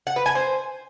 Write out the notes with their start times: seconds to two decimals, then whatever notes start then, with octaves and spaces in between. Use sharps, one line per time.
0.07 F#5
0.16 B4
0.26 G#5
0.35 C5